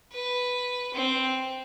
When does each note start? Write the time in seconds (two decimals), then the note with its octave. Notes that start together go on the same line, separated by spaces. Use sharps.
0.12 B4
0.94 C4